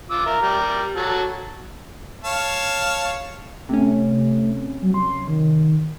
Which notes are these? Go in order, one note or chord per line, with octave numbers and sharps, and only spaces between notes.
F4 D6 E6
A#4 E5
G3 A#4
F#3 F#4 A4
C#5 F5 A5
C3 A3 C#4
F#3
C6
D#3